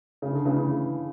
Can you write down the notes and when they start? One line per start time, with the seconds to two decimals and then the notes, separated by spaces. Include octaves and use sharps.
0.22 C#3
0.33 D3
0.45 C#3 E3